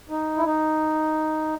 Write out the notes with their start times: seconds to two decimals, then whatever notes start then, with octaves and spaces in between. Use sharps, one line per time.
0.10 D#4
0.37 E4
0.46 D#4